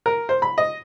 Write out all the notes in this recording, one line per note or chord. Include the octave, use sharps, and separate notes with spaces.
A#4
C5
B5
D#5